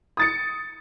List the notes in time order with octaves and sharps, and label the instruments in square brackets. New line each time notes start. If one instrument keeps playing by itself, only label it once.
[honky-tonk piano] D#6 A6 C#7